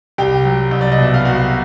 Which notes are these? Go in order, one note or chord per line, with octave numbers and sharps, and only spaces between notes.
C2 G4 G5
F#3
C2
D5
D#5
B2 E5
F5
C2 F#4 F#5